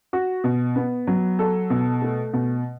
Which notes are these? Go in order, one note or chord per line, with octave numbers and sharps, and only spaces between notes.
F#4
B2
B3
F#3
A4
B2
A3
B2